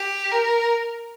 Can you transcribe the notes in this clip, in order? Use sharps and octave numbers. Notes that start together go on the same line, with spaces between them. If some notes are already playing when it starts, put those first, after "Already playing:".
Already playing: G4
A#4